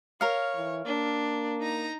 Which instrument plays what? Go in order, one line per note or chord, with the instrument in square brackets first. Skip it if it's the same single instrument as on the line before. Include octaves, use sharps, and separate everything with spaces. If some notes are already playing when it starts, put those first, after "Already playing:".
[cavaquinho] A#4 F5 [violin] C#5
[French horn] E3
[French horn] A#3 [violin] D4
[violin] D#4 A#5